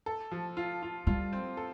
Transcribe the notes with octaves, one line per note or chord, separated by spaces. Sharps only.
A4
F3
F4
F4
G3 F4
C4
A4